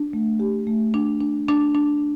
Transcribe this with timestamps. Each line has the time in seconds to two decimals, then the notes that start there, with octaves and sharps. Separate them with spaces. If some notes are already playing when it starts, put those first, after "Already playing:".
Already playing: D4
0.13 A3
0.40 G4
0.67 A3
0.94 D4
1.21 D4
1.48 D4
1.75 D4